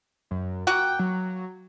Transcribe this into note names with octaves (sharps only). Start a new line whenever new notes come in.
F#2
A#3 F#4 F#5 G5
F#3